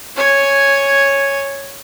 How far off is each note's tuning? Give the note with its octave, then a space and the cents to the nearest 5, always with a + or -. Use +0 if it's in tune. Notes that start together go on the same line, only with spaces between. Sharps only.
C#5 +0 G#5 +0